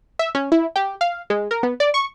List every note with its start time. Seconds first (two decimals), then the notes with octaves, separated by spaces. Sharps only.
0.19 E5
0.35 C#4
0.52 E4
0.76 G4
1.01 F5
1.30 G#3
1.51 A#4
1.63 B3
1.80 D5
1.94 C#6